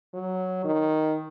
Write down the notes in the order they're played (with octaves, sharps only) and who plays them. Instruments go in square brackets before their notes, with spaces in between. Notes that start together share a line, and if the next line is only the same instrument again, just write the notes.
[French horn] F#3
D#3